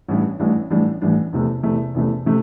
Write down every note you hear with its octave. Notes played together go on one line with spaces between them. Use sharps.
A1 A2 E3 G3 D4
A1 A2 E3 G3 D4
A1 A2 E3 G3 D4
A1 A2 E3 G3 D4
E2 C3 A3
E2 C3 A3
E2 C3 A3
C3 A3